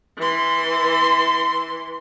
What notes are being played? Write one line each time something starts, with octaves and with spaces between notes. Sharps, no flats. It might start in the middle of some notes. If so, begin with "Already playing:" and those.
E3 C6